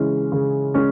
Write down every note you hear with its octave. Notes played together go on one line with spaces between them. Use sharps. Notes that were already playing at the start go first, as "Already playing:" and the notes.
Already playing: C#3 E3 G#3 C#4
C#3
G#3 C#4